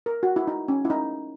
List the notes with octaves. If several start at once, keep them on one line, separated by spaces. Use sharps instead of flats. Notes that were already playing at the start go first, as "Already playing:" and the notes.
A#4
F#4
E4
D#4
C#4
E4
D#4